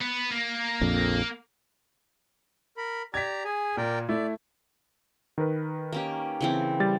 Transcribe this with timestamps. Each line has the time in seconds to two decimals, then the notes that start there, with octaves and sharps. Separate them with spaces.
0.01 B3
0.31 A#3
0.81 A#1 F2
2.77 A#4 B5
3.14 G4 D5 A#5 G#6 B6
3.45 G#4 G#5
3.77 A#2 A#4 D5 G5
4.09 A3 E4 D5
5.38 D#3 A#4 B4
5.92 A#3 C#4 G4
6.41 C#3 E3 C4
6.80 G3 A6